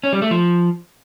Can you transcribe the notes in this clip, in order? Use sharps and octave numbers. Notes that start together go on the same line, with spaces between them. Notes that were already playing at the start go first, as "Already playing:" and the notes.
C#4
G3
A3
F3